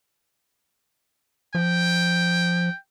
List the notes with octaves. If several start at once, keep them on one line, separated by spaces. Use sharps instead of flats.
F3 G5